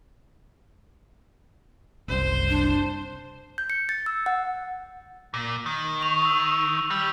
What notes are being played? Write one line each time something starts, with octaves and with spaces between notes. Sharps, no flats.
F#1 C2 C5
D4
G6
C#7
A6
E6
F#5
A#2
D#3
C#6 F7
E6
G3 E6